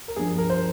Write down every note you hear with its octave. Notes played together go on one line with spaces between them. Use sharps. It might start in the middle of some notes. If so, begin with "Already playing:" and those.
A#4
G2 F3 G#4
A#4
C5